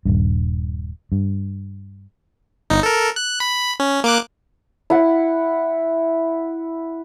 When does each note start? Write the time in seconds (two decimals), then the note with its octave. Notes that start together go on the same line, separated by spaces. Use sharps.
0.05 D#1 G2
1.12 G2
2.70 G1 D#4
2.83 A4 A#4
3.16 F#6
3.40 B5
3.80 C#4
4.04 A#3 D6 F#6
4.90 E4 F#5